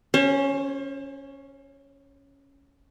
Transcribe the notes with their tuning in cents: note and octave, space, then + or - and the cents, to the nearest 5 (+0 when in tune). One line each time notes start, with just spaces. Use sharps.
C#4 +0 C5 +40